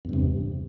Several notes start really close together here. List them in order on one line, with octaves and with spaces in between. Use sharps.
E2 G2 C3